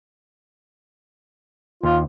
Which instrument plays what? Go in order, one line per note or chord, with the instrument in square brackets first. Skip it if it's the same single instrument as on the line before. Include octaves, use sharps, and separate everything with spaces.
[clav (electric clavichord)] D#2 [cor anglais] F4